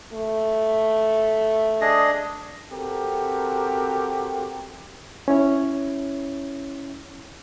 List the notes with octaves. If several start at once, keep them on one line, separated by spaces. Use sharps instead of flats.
A3
D4 G#4 D#5
C4 F#4 G4 A4 A#4
C#4 E4 C#5